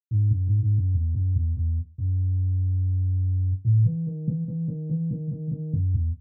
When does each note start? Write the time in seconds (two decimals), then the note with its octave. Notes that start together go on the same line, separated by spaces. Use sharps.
0.11 G#2
0.31 F#2
0.47 G#2
0.63 G#2
0.78 F#2
0.94 E2
1.15 F#2
1.36 E2
1.57 E2
1.98 F#2
3.65 A2
3.86 E3
4.07 D#3
4.28 E3
4.48 E3
4.68 D#3
4.90 E3
5.11 D#3
5.31 D#3
5.51 D#3
5.73 F#2
5.94 E2